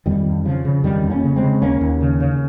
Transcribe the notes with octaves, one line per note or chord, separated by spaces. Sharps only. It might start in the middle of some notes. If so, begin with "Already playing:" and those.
F2 D#3 G3
F2
C#3 F3
C#3
F2 D#3 G3
F2
A#3 C#4
C#3
G#3 C4
C#3
D#2 A#3 C#4
D#2
C#3
C#3